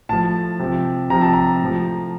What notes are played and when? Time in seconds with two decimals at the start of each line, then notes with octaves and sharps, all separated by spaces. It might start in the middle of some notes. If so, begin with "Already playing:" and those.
0.09 A2 F3 A5
0.59 C3 F3
1.10 C3 F3 A#5
1.21 A5
1.33 A#5
1.61 A2 F3